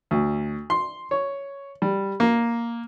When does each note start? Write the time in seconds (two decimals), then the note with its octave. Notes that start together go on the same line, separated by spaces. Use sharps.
0.11 D2
0.70 C6
1.11 C#5
1.82 G3
2.20 A#3